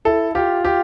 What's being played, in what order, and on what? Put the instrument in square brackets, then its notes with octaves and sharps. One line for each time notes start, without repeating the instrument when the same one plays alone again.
[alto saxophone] E4 [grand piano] A4
[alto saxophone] F4 [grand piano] G4
[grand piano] G4